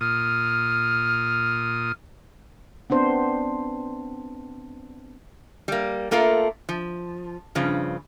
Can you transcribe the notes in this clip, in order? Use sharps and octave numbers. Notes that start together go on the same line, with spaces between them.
A#2 D#6 F6
B3 C4 D4 C5
G3 A#3
A3 A#3 F4 A4 A#4
F3
G2 C#3 F3